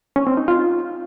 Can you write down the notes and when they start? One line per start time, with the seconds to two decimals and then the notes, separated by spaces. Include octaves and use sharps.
0.16 C#4
0.27 C4
0.37 D#4
0.48 F4